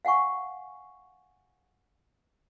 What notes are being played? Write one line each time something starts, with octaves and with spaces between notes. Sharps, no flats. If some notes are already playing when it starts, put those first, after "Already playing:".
F5 F#5 G#5 C#6